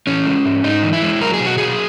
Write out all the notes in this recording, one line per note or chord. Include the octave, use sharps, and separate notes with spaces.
E3 C#4
G#3
G#2
G#2 D#4
E3
E4
G#3
F#3 A#4
G#4
B2
F#4
F#3 G#4